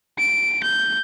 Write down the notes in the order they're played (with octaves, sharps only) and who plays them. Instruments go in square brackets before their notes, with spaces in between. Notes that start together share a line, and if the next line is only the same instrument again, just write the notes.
[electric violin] D7
G6